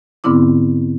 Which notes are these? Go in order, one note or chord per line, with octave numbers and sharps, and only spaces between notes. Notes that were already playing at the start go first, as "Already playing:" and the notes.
G#2 D3 B3 C4 E4 D6